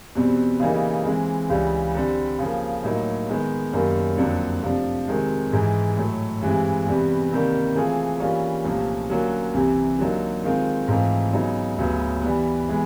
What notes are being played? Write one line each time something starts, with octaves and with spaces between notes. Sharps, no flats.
E2 B2 G3 C4
C#3 E3 G3 A#3 D#4
E3 G#3 C4
C#2 C#3 E3 G3
D3 G3 C4
C#3 F3 A#3
A2 F#3 A#3 D#4
D#3 G#3 B3
F#2 D#3 G3 A#3 C#4
F2 D3 F#3 A#3 D4
C3 F3 A3 D4
C3 D#3 G#3 C4
G#2 E3 G#3
A2 F#3 A3
G2 E3 G#3 C4
E2 C3 E3 G3 B3
C3 D#3 G3 A#3
E3 A3 C4 F4 G#4
E3 G3 A#3 C#4 F4
C2 A#2 F3 A3 C#4
D3 F#3 A#3 C#4 F#4
C2 C3 E3
D3 F#3 A#3 D#4
D#3 G#3 C4 F4
G#2 E3 A3 C4 F4
C#3 F#3 B3 D#4
D2 C#3 F#3 B3
E3 G3 B3
E3 G#3 B3